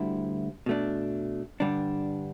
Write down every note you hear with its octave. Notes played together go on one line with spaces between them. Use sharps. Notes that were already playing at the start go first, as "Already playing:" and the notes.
Already playing: D2 D3 G3 E4
B2 A3 D4
G2 D3 G3 D4